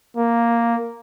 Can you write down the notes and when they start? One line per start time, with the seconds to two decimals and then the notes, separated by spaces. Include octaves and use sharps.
0.17 A#3